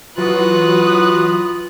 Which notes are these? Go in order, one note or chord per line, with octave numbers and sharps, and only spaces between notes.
E3 F#3 F4 F#4 B4 D#6 F#6